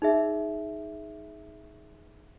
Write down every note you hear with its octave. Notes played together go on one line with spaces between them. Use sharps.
D#4 G#4 E5